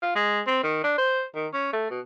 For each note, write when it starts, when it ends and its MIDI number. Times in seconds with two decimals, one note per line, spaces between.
0.02 0.15 65
0.15 0.40 56
0.47 0.60 60
0.63 0.81 51
0.84 0.93 62
0.98 1.24 72
1.35 1.47 51
1.53 1.72 61
1.73 1.86 57
1.91 2.00 47